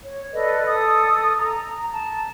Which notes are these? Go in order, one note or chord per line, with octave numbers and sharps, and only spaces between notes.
C#5
A4 B4 D5 D#5
A4 D#6
A#5
A5